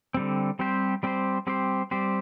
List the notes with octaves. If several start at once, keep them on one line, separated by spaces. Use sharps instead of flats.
D3 G3 C4
G3 C4 G4 C5
G3 C4 G4 C5
G3 C4 G4 C5
G3 C4 G4 C5